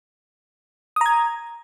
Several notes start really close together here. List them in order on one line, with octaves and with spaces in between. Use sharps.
D#6 A#5 G#6